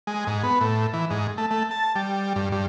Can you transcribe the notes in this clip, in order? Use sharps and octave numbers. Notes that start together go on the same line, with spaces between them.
G#3
G#2
B3
A2
E3
G#2
A3
A3
A5
G3
G2
G2